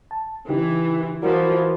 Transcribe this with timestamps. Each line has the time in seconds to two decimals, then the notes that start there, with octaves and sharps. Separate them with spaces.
0.11 A5
0.49 C#3 E3 D#4 G4
1.22 E3 F3 F#4 A#4 D5